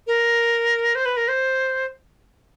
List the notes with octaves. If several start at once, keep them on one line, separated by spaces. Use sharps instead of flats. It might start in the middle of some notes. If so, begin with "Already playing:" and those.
A#4
C5
B4
A#4
C5